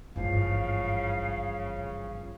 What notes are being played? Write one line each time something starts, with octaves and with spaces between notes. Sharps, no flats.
G#1 G2 C#3 E3 F3 F5